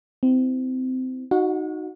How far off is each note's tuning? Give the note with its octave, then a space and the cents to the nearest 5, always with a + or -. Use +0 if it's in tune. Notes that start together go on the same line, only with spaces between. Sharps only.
C4 -25 E4 +0
D#4 +0 F#4 +0 F#5 -35